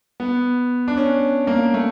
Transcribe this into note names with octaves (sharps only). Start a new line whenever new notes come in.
B3
D4
C#4
A#3
A3